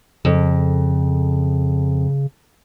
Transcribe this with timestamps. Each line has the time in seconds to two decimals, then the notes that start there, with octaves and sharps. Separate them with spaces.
0.25 F2 C#3